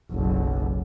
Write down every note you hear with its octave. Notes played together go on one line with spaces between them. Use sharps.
F#1 B1